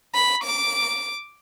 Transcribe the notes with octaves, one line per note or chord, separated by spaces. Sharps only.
B5
D6